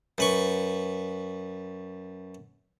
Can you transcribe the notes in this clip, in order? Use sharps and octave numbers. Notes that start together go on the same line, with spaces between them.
F#2 B4 C#6